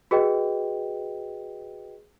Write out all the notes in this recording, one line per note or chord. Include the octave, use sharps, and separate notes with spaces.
F#4 G#4 B4 D#5 G5